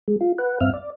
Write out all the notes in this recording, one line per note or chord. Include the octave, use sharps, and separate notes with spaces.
G#3
F4
B4 F#5
G2 C4 E5 F5 F6
D5